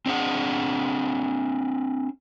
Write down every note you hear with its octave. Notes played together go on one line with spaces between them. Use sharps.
C4 D4 G#4 F#5